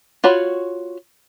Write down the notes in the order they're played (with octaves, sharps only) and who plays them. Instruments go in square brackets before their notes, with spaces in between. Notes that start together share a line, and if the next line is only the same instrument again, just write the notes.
[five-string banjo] F4 F#4 C#5 B5